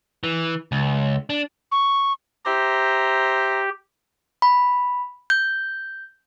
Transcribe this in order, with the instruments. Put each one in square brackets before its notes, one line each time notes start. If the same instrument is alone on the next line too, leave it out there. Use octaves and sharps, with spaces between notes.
[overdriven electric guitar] E3
C#2
D4
[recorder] C#6
[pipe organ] G4 [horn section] C5 E5 A#5
[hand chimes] B5
G6